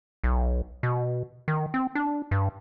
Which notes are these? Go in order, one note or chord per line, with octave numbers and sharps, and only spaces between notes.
B1
B2
D#3
C4
D4
G2